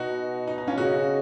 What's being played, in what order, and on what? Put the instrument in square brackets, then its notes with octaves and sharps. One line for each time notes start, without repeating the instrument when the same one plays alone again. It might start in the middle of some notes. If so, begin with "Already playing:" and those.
Already playing: [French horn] B2 [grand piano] D#4 F#4
[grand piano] D#4
D#4
C#4 F4
[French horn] C#3 [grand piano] D#4 F#4